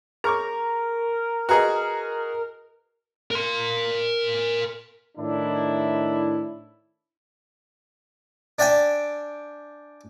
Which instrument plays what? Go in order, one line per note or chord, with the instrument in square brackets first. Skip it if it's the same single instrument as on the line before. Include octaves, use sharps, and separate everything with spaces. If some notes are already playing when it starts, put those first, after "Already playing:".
[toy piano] G#4 C#5 D6 [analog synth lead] A#4 [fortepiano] A#5 C#6
[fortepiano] F#4 G#4 D#5 [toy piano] B4 A#5
[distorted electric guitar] A#4 C6
[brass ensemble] A2 D#3 D4 E4
[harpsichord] D4 D5 E5 G5 G#5